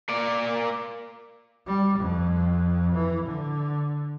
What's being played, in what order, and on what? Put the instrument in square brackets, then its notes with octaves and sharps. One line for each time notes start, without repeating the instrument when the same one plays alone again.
[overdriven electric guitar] A#3 D5
[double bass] G3
F2
E3
D3